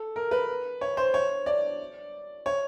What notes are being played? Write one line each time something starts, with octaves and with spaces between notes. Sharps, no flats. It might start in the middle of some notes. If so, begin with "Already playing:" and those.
Already playing: A4
A#4
B4
C#5
C5
C#5
D5
C#5